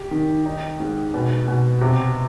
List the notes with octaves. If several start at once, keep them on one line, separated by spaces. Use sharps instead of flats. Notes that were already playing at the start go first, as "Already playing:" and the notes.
Already playing: G4
D#3
D#4
G#2
B2
B2
C3